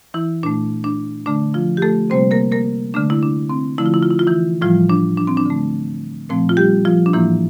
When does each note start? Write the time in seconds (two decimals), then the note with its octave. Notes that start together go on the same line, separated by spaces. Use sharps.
0.14 E3 E4
0.43 A#2 A3 D4
0.84 D4
1.26 D3 A3 D4
1.54 F3 F4
1.77 G4
1.82 A3 A4
2.10 C3 G3 A#3 C4 C5
2.31 A#3 A#4
2.52 A#3 A#4
2.94 D3 A3 D4
3.10 E4
3.23 D4
3.50 C4
3.78 D3 F3 A3 E4
3.86 F4
3.94 E4
4.03 F4
4.11 E4
4.19 F4
4.27 E3 E4
4.62 A2 E3 F3 G3 F4
4.90 D4
5.17 D4
5.27 C4
5.37 D4
5.46 D3 A3
6.29 A#2 F3 A3 C4
6.49 F4
6.57 G3 G4
6.85 F3 F4
7.06 D4
7.13 A2 E3 F3 A#3 E4